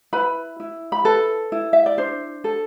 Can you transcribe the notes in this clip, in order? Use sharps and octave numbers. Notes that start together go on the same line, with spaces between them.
E4 B4 B5
E4
B5
A4 B4 A5
E4
E5
D5
D4 C5
A4